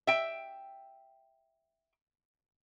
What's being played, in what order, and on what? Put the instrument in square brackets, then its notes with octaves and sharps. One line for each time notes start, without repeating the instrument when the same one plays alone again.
[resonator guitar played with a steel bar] E5 G5